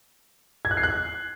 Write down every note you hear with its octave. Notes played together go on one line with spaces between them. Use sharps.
G#6
F#6
C7
F#6